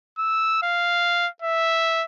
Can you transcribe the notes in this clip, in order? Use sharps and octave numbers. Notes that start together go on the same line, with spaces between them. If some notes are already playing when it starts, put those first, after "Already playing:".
E6
F5
E5